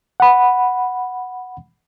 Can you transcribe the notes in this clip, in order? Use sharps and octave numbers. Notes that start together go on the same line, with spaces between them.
F#5 B5